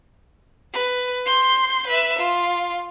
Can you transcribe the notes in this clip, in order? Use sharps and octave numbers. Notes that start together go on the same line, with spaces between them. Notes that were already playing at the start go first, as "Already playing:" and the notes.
B4
C6 G6
B4 E5
F4